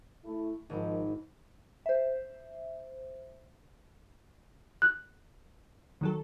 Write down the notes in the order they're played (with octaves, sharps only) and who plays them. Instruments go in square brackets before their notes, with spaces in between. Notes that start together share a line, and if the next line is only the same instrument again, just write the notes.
[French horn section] A3 E4
[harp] G#1 [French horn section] F3 D#4 A#4
[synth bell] C5 E5
[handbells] F#6
[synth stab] D#3 F#3 A4